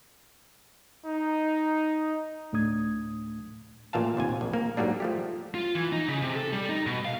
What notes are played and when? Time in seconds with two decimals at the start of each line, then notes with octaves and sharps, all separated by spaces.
1.06 D#4
2.52 D2 A2 A3 D4 D#6 G#6
3.93 A1 A#2 E5 F5 A5
4.17 D#2 C3 G#5
4.41 A#1
4.53 A#3
4.77 G#2 F#3 G3 A#3 D4
5.00 F3 A3 G4
5.55 F4
5.75 E3
5.92 D#4
6.08 C#3
6.22 C3
6.35 A4
6.53 G3
6.69 D#4
6.86 B2
7.05 F5